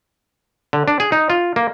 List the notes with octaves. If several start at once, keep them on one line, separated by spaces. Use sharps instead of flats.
D3
D4
G#4
D#4
F4
A#3